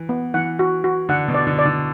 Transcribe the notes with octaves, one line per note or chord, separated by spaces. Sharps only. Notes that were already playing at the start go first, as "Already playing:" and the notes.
Already playing: E3
B3
E3 F#5
F#4
F#4
D3 F#5
B2
D5
D3
D5
D3